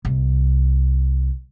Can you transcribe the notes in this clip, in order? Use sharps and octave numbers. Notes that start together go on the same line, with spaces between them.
C2